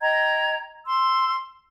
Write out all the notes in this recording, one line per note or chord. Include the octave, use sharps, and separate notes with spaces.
D#5 G5 A#5 G#6
C6 E6